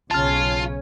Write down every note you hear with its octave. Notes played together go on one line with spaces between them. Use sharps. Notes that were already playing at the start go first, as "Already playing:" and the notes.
B1 C#3 C#4 F4 A5 F6